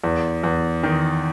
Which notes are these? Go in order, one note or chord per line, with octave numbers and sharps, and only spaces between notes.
E2
E2
D#3